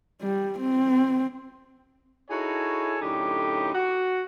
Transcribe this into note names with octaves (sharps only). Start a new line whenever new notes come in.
G3
C4
D#4 E4 F#4 G#4 A4 C#5
F#2 A2 D3 D#4 G4
F#4